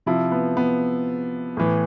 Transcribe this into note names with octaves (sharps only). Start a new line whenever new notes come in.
C3 F3 E4
B3
B3
A2 E3